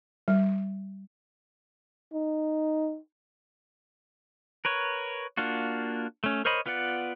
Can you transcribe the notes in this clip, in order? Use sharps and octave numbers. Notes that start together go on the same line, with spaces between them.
G3
D#4
A#4 B4 C#5
A#3 D4 F4 F#4
A3 C#4
A#4 C5 C#5 D#5 B5
B3 F4 B4 D5 F#5